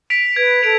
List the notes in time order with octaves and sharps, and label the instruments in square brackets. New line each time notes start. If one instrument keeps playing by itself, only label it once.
[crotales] B6 D7 F7
[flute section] B4 [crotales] G#6
[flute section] A4 [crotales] D7 F7